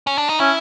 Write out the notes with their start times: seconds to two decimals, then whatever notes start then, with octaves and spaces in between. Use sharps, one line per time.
0.07 C#4
0.18 D4
0.29 D#4
0.40 C#4 E4